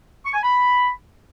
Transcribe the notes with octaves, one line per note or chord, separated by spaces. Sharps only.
C#6
G#5
B5